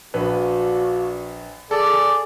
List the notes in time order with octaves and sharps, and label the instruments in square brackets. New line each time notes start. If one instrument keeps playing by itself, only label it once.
[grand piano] A#1 B4 [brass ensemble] D4 F4 F#4
[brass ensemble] G#4 [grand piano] A4 [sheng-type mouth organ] D5